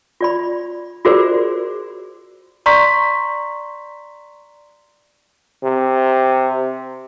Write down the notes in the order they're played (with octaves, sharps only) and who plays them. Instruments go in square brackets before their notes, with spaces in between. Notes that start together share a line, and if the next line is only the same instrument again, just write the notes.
[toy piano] F4 D5 B5
F4 F#4 G#4 A#4 C5 D5
[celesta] D5 A#5 C6 C#6 B6
[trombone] C3